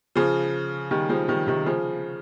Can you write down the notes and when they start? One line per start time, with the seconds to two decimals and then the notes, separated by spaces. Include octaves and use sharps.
0.15 C#3 F3
0.90 D#3 G3
1.09 F3 G#3
1.28 D#3 G3
1.47 C3 D#3
1.66 C#3 F3